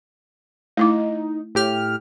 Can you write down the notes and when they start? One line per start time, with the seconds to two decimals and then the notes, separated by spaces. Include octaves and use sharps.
0.77 A3 D#4 E4 D6
1.55 A2 G4 F6